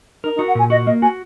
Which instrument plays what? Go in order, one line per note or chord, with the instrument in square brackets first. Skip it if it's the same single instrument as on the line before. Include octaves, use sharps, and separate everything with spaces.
[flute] D#4 [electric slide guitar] A#4
[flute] D#4
[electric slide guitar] F#4
[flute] F#5
[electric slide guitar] A#2 [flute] G#5
[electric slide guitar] F#4 [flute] D#5
[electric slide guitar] A#3 [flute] D#5
[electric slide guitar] F#4 [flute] G#5